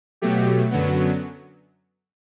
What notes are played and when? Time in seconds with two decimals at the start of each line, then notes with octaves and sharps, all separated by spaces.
0.22 B2 F#3 A3 G4
0.71 F#2 D3 F#3 B3